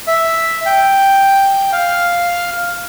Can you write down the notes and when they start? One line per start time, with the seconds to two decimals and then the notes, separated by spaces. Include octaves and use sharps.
0.07 E5
0.66 G5
1.72 F5